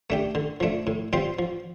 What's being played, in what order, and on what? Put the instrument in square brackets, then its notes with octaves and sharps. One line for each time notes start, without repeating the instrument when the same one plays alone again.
[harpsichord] A3 D4 G4
D3
F3 A3 D4
A2
G3 C4 F4 C5
F3